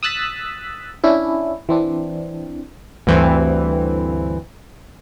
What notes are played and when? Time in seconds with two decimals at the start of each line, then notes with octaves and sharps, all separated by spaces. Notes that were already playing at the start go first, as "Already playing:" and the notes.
0.03 D#6 E6 F#6 A6 B6
1.04 C#4 D4 E4
1.69 E3 C4 D4
3.07 D2 G2 E3 C4